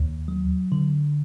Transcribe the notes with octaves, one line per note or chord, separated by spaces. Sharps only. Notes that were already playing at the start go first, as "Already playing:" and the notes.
Already playing: D#2
F#3
D3